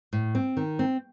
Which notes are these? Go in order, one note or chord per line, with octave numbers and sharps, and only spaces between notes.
A2
C4
D#3
C4